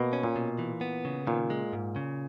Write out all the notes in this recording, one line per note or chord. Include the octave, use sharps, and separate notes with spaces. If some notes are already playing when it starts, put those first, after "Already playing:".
Already playing: B2 A#3
C#4
A#2
B2
E3
B3
C#3
A#2 D#3
G#3
G#2
C#3